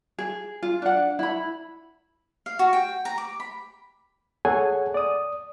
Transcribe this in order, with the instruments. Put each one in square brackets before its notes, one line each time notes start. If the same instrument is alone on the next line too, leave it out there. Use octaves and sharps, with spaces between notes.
[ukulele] G#4
F4
D4 F#5
E4 B5
[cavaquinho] F5
F#4
G5
A#5
D6
B5
[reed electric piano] G#4 A4 C#5 F#5 G#5
D5 D#6